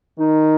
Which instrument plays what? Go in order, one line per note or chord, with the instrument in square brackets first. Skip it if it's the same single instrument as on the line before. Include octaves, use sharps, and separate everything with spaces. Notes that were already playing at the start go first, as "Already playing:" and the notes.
[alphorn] D#3 [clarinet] D#4